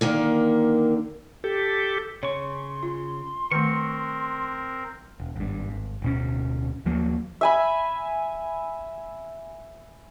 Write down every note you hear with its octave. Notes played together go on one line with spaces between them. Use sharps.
D3 D#3 A#3
G4 A4
C#3 C#5 C6 C#6
F4
D#3 A3 C4 A#4 C#6
E1
G#1 G2
G#1
D1 B2 C#4
D#2 F3 F#3 A#3
E5 G#5 B5